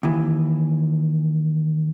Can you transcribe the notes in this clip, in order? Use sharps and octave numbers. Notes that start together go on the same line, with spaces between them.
D#2 E3